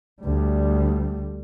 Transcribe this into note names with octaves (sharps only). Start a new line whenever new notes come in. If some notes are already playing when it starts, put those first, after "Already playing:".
D2 G3